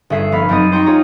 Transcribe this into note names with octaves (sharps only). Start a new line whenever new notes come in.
G1 C#4 G#4 E5 C7
F1 B3 F5 B5
F#2 F#3 C4 D#4 D#6
C5 G5 A#5 C#6
F4 G#4 C#5 A#5